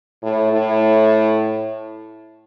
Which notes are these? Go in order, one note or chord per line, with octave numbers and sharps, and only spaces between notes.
A2
A2